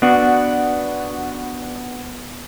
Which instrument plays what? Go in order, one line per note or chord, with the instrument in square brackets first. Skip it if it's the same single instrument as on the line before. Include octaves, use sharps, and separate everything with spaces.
[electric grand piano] B3 [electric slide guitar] D4 F#4